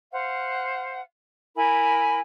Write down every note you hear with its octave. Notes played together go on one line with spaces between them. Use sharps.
C5 F5 F#5
E4 A#4 G#5 B5